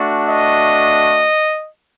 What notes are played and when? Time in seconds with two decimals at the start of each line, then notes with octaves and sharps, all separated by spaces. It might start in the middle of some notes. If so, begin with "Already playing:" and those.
Already playing: A3 D4 F#4
0.26 D#5